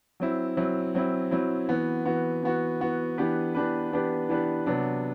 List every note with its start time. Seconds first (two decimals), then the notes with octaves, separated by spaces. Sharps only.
0.20 F#3 C4 E4
0.57 F#3 C4 E4
0.95 F#3 C4 E4
1.31 F#3 C4 E4
1.69 E3 B3 F#4
2.06 E3 B3 F#4
2.43 E3 B3 F#4
2.80 E3 B3 F#4
3.18 E3 B3 D4 G4 B4
3.55 E3 B3 D4 G4 B4
3.92 E3 B3 D4 G4 B4
4.29 E3 B3 D4 G4 B4
4.66 C3 F#3 B3 D4